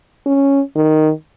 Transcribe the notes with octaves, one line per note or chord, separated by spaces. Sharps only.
C#4
D#3